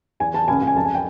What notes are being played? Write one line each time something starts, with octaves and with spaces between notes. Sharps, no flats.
E2 G#5
E2 A5
C#2 G#5
C#2
G#5
F2 A5
G#5
G5